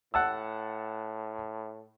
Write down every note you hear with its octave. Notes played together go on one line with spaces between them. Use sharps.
A2 F#5 A5 E6